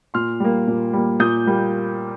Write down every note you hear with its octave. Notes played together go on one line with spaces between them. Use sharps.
A#2 C6 F6
G3 A#3
A#2
G3 A#3
A#2 D#6 G6
G3 A#3